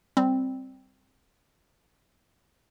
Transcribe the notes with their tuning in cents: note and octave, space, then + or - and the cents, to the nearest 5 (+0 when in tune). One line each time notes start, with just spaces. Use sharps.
G3 +0 C4 +0